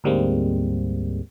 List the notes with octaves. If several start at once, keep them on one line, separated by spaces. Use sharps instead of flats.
D2 G#2 G3 G#3 A#3 C4